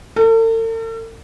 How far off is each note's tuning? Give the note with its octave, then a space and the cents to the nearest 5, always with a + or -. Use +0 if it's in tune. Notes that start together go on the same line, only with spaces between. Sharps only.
A4 +45